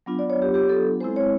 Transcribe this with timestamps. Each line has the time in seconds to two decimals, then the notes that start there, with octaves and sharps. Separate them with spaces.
0.06 F#3 B3 D4 F4
0.19 D5
0.30 C#5
0.42 G4
0.54 G4
0.69 A4
1.00 G#3 C4 E4 C5
1.16 C#5